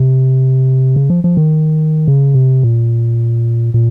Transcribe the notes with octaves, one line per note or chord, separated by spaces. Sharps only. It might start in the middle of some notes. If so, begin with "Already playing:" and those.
Already playing: C3
C#3
F3
F3
D#3
C#3
C3
A#2
A#2